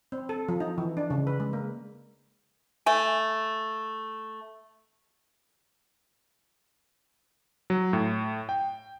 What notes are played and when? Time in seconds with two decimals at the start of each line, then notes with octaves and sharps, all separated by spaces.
0.12 C4
0.29 A4
0.49 F3
0.60 D#4
0.78 E3
0.97 D4
1.10 C#3
1.27 B4
1.40 G#3
1.53 A#3
2.86 A3 G#5
7.70 F#3
7.93 A2
8.49 G5